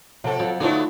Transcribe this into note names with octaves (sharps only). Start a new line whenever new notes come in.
C3 F3 A4
F2 F#3
D3 F#3 A3 B3 D4 D#4 F4 F#4